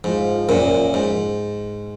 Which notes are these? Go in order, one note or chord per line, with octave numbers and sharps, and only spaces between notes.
G#2 F3
F#2 A#2
G#2